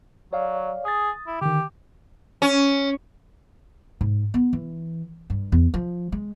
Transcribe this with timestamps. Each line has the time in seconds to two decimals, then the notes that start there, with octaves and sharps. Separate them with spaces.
0.33 F#3 C#5 D5 F5
0.85 G#4 D#6 A6
1.27 E4
1.42 D3 D#3 G4
2.42 C#4
4.01 G#2
4.34 B3
4.53 E3
5.30 G2
5.52 E2
5.74 F3
6.12 G#3